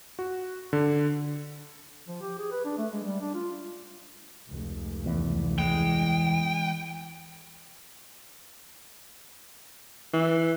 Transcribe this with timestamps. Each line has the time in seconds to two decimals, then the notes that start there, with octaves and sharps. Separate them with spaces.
0.19 F#4
0.73 D3
2.08 F3
2.21 G4
2.39 G#4
2.51 B4
2.65 D4
2.78 A3
2.93 G#3
3.04 G3
3.21 D4
3.34 F4
4.49 F1 C#2
5.06 E2
5.59 E3 G#3 G5
10.13 E3